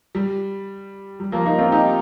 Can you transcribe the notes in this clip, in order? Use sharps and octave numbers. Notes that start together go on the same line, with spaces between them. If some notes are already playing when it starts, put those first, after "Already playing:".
G3
G3
F3 A#3
A#3 D#4
C4 F4
D#4 G4